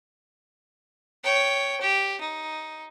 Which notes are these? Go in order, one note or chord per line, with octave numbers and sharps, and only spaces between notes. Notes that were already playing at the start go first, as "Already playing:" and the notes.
C#5 G5
G4
D#4